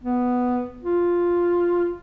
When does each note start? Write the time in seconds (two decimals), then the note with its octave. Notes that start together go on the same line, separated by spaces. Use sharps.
0.04 B3
0.83 F4